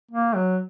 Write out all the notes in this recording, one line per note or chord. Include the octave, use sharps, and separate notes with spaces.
A#3
F#3